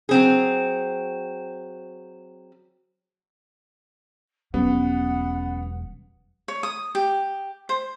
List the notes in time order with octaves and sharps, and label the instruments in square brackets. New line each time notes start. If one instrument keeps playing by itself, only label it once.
[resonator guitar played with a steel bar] F#3 C4 G#4
[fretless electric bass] E1 F#3 G3 [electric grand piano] B3 [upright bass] C#4 [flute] F#5
[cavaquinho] C#5
D#6
G4
C5